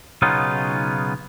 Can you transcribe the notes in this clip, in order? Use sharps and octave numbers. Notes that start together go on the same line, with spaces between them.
B1 C#3 B3 C#4 D#4 F4